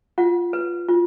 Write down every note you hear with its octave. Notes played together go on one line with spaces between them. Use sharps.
F4 F#5
B4
F4